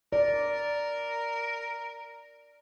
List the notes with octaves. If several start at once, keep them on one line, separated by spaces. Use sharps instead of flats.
A#4 D5